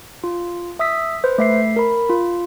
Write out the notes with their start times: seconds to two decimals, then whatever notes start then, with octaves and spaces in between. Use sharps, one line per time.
0.24 F4
0.79 E5 D#6 E6 B6
1.24 B4 C5
1.38 A3 E5 C7
1.76 A#4 B5
2.10 F4